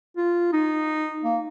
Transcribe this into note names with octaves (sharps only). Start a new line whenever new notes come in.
F4
D#4
A#3